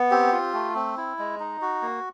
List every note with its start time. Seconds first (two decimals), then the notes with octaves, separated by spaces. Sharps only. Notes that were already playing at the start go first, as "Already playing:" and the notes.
Already playing: B3
0.11 C4 G4
0.32 F4
0.54 A3
0.75 C4
0.97 E4
1.19 G#3
1.40 D#4
1.62 F#4
1.82 A#3